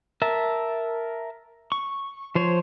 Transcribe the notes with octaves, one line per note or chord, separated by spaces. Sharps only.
A#4 E5 A5
C#6
F3 C5 C#5